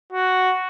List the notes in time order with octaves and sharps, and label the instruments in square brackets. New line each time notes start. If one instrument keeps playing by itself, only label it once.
[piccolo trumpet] F#4